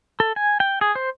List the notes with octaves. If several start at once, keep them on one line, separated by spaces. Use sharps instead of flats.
A4
G#5
G5
G#4
C5